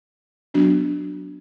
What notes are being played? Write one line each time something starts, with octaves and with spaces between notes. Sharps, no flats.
F#3 B3 D4 F#4